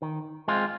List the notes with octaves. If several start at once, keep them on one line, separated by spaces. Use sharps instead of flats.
D#3
G#3 C4 F4